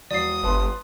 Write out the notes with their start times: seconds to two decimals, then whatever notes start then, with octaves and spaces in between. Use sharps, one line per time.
0.11 E1 D5 D#6 C7
0.43 G1 B4 A5 C6